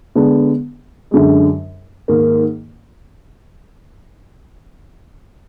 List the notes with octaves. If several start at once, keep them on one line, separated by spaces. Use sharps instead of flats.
D3 G#3 B3 D4
F#2 D3 G#3
G#2 D#3 A#3